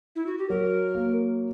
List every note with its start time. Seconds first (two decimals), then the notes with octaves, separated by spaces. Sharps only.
0.16 E4
0.26 F#4
0.38 G4
0.49 F#3 A#4
0.95 A#3